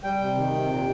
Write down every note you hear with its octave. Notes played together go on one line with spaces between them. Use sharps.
G3 G5
C3
D#3
C3
A#2